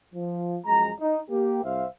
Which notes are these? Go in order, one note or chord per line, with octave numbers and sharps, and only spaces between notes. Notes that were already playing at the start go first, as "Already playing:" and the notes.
F3
F#2 F3 G#3 A#5
D#4
A#3 G4
C2 C5 E5 F5